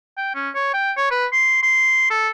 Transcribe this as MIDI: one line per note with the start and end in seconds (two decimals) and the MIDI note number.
0.17 0.33 79
0.35 0.50 61
0.55 0.72 73
0.74 0.92 79
0.97 1.09 73
1.11 1.26 71
1.32 1.61 84
1.63 2.10 84
2.10 2.29 69